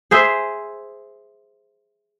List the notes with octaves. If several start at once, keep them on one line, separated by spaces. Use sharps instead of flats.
G#4 C5 E5